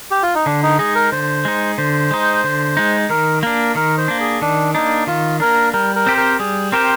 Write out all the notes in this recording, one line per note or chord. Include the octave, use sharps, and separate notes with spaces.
G4
F4
D#4
D3 D4
D#4
G#3 D#4 G#4
A#4
D3 C5
G#3 D#4
D3 C5
G#3 D#4
D3
G#3 D#4
D#3 A#4
A#3 D4 A#4
D#3 A#4
C5
A#3 D4
G#4
D#3 D4
A#3 D4 D#4
D#3 F4
A#3 D4 A#4
G3 A#4
A#4
C4 G4 C5
A#4
G3 G#4
C4 G4 A#4 C5